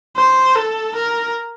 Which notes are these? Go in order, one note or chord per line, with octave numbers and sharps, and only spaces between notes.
C5
A4
A#4